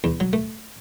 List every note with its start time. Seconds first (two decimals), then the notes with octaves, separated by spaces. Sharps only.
0.04 E2
0.20 F#3
0.33 A3